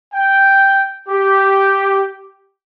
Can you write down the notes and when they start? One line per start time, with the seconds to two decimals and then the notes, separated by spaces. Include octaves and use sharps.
0.14 G5
1.09 G4